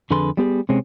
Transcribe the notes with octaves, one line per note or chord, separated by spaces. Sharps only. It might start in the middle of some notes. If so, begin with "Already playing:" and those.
F2 D3 G#4 B4 C6
G3 B3 G4 G#4
C3 G#3 C4 C#4